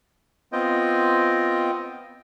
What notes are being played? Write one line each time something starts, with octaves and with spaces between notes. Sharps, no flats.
B3 C4 F4 D#5 G5